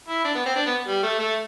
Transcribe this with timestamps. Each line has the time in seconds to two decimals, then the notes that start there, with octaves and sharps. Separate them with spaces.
0.08 E4
0.24 D4
0.35 B3
0.46 C4
0.56 D4
0.66 B3
0.87 G3
1.03 A3
1.19 A3